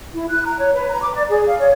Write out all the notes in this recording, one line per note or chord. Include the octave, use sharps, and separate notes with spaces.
E4
F#6
A#5
C#5
B4
A#5
D6
D5
G#4
F5
C#5